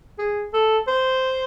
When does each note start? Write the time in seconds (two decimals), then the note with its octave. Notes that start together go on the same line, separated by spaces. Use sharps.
0.18 G#4
0.53 A4
0.88 C5